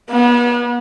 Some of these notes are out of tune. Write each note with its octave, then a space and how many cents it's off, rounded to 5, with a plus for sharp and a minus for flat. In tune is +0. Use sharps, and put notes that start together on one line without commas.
B3 -35